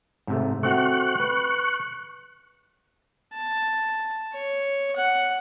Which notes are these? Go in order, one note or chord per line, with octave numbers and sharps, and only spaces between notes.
G#2 C3 A3
A3 C4 F#4 C#6 F#6
B4
A5
C#5
F#5